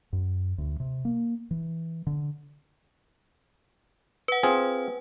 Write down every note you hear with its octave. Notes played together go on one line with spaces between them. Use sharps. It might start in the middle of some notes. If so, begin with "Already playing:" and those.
F#2
D2
C3
A#3
E3
D3
B4 F#5
C4 F4 G#4